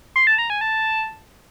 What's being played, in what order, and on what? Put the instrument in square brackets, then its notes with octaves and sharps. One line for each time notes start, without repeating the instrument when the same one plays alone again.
[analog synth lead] C6
A5
A#5
G#5
A5